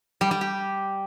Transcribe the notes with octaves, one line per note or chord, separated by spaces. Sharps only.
G3
G3
G4